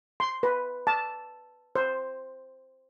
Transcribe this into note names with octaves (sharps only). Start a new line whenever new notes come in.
C6
B4
A5
C5